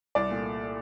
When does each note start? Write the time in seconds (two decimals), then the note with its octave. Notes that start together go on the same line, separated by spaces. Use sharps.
0.15 C2 D5
0.31 A#2 A3